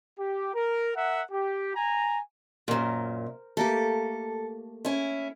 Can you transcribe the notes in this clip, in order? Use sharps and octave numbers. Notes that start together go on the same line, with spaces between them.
G4
A#4
A#4 E5 F#5
G4
G#5 A#5
F#2 A#2 A#4 C5
A3 A#3 G4 A4
C#4 E4